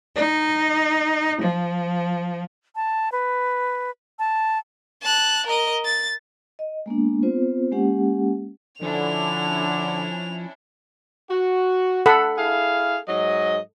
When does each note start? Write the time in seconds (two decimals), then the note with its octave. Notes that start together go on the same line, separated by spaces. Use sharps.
0.14 D#4
1.41 F3
2.76 A5
3.12 B4
4.19 A5
5.02 A5 F#6
5.47 A#4 D#5
5.85 A6
6.59 D#5
6.86 G#3 A#3 B3 D4
7.23 B3 C4 F4 C5
7.72 G#3 A#3 C#4 G4 F#5
8.82 D3 F3 C#4 D4 E4 F7
11.31 F#4
12.06 A4 F#5 B5
12.38 E4 G#4 F5
13.08 G#2 F#3 D#5